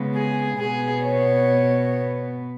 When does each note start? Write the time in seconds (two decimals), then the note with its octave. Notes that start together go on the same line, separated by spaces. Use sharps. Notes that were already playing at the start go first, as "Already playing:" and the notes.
Already playing: C#3 G#3 B3
0.14 G#4
0.59 B2 B3 G#4
1.05 C#5